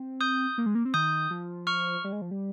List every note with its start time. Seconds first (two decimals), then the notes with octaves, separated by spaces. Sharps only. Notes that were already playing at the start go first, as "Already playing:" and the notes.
Already playing: C4
0.21 D#6 G6
0.58 A#3
0.66 G#3
0.75 A#3
0.85 C4
0.94 D#3 D#6 G6
1.31 F3
1.67 C#6 F6
2.04 G3
2.12 G#3
2.22 F3
2.31 G3